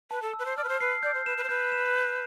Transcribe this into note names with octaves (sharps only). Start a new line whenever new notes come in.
B4 A5
A4
E6
B4
C5
D5 F6
B4
C5
B4 C7
D5 G6
C5
B4 E7
B4
C5
B4 G6
E7
G6